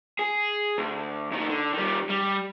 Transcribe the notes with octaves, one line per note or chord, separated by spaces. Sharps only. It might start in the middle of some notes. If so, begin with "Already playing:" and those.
G#4
D2
D2 D#3
D3
D#3 G3
G3